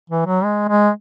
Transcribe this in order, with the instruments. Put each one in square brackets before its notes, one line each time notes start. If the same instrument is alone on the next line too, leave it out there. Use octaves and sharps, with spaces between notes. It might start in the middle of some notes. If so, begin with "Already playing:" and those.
[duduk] E3
F#3
G#3
G#3